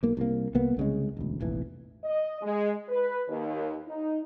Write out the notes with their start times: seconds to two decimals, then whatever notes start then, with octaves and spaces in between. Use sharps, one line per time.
0.03 B1 A#3
0.17 C2 A#3
0.55 C2 A#3 B3
0.77 C2 C#3 G#3
1.17 E1 D2
1.41 F1 A#1 E3
2.04 D#5
2.42 G#3
2.88 B4
3.29 D#2
3.88 D#4